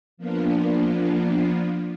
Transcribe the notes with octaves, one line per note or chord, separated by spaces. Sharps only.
F3 A#3 B3 D4 F4